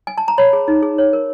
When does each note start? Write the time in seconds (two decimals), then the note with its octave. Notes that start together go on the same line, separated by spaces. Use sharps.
0.07 G#5
0.18 A5
0.28 A#5
0.38 C#5 B5
0.53 G#4
0.68 D#4
0.83 G#4
0.98 C#5
1.13 A#4